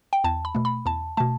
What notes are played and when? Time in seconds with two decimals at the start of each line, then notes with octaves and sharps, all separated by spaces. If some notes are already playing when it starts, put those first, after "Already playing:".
0.13 G5
0.24 E2 A5
0.45 B5
0.55 B2 A3
0.65 B5
0.86 E2 A5
1.17 B2 A3 A5